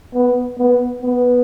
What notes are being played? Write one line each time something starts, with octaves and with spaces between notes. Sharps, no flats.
B3
B3
B3